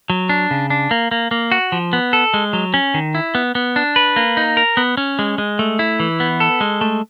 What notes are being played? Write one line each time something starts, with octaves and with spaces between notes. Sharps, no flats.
F#3
D4
C#3
D4
A#3
A#3
A#3
F#4
F3
B3
A4
G#3
F#3
C#4
D#3
E4
B3
B3
D4
B4
A#3
D#4
A#4
B3
C#4
G#3
G#3
A3
E4
E3
B3
A4
G#3
A3